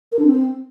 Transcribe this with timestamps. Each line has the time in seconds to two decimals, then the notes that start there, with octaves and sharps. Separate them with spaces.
0.12 A#4
0.19 D4
0.26 C4